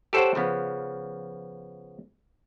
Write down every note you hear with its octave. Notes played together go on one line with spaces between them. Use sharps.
G4 A4 C5 C#5 F#5
C#3 F3 B3